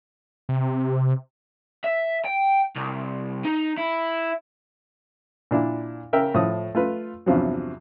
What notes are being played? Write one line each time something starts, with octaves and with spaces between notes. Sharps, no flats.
C3
E5
G5
C2
D#4
E4
A#2 D4 E4
C#3 A#4 E5 G5
A2 F3 D#6
A3 F4 B4
E2 G2 C3 F3 F#3